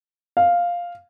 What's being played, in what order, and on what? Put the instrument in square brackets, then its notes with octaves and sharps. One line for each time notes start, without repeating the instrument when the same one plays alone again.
[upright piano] F5